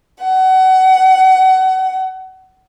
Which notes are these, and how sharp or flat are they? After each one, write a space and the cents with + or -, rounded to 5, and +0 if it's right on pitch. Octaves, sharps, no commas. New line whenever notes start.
F#5 +25